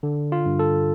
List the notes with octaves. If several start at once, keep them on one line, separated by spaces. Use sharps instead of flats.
D3
F4
G2
A4